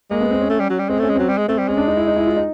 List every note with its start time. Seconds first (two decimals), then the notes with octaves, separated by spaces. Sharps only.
0.11 G#3 A#3
0.21 B3
0.31 C4
0.41 C#4
0.50 A3
0.60 G3
0.70 F#3
0.79 G3
0.89 G#3 C4
0.99 A3 C#4
1.09 G#3
1.16 F#3 C4
1.29 G3
1.38 G#3
1.48 A3 C4
1.58 G3
1.68 G#3 C#4
1.77 D4
1.88 D#4
1.97 E4
2.07 D#4
2.16 E4
2.27 F4
2.36 D#4